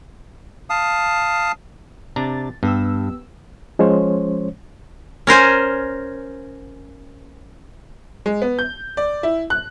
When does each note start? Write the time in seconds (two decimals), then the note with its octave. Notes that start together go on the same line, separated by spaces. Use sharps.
0.70 F5 A5 D#6
2.16 C3 D4 A#5 A6
2.63 G2 B3 G4 E6
3.79 F3 G#3 C#4 C5 C#5
5.27 C#4 A#4 C5 G#5
8.26 G#3
8.42 B3
8.59 G6
8.97 D5
9.23 E4
9.50 F#6